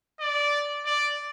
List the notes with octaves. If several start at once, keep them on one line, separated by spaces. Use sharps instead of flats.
D5
D5